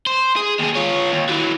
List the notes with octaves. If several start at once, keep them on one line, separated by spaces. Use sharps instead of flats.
C5
G#4
D#2 G#4
F4 C#5
D#2
E3 F#3